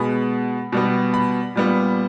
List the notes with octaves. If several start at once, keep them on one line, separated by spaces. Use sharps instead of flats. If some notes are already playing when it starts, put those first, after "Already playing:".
Already playing: B2 G#3 B3 B5
B2 G3 B3
B5
A#2 G3 B3